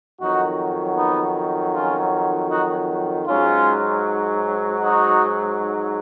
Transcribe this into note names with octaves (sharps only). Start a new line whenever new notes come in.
F2 D#3 F#3 D#4 F#4
B3 D#4
C#4 F4
D#4 F#4
G#2 F#3 C#4 F4
D#4 F#4